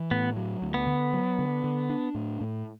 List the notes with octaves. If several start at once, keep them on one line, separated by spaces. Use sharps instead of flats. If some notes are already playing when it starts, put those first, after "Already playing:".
Already playing: E3
A2 B3
F#3
D2
B3
D3
F#3
D3
D3
D4
A2
A2